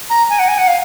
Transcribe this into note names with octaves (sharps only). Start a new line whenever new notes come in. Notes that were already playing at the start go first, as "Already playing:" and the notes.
A#5
G#5
F#5
G#5
F#5
F5